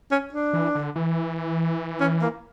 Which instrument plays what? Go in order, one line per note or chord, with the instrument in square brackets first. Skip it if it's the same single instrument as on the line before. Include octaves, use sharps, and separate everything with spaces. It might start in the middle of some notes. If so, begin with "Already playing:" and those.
[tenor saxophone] C#4
D4
[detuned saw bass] E3
D3
E3
[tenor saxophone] C#4
A#3